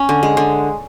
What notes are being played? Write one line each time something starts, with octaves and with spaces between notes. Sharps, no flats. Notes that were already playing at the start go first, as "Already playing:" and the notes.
Already playing: C#4
D3
G#3
D3